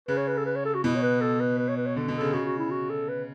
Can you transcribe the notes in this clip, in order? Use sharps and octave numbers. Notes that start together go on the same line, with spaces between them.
C#3 B4
C#5
B4
A4
B4
C#5
A4
F#4
B2 E4
C#5
B4
A4
B4
B4
C#5
B4
C#5
D3
B2
A4
C#3
C#3 F#4
F#4
E4
F#4
A4
B4